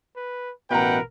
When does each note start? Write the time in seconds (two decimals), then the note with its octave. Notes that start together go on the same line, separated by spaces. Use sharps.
0.16 B4
0.71 A1 B2 E4 A#4 B4 F#5 G5 A#5